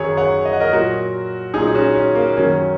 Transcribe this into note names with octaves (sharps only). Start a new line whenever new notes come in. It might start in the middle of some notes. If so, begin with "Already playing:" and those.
Already playing: F#2 D#3 F#3 G#4 C#5
C#5 F#5
D#5
F#5
A#4 D#5
A#2 F#3 F#4 A#4
A#2 F#3 D#4 G#4
D#4
C#4 F#4
C#4
A#3
F#2 D#3 F#3 C#4